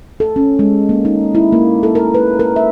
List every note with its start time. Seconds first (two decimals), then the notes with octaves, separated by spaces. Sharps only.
0.20 A4
0.36 C#4
0.59 G#3
0.89 A#3
1.05 D#4
1.35 E4
1.52 A#3
1.83 A4
1.95 A#4
2.14 B4
2.40 A#4
2.56 E5